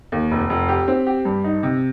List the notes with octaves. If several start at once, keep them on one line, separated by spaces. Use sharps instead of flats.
D#2
F1
F1
G4
C4
G4
G2
D#4
C3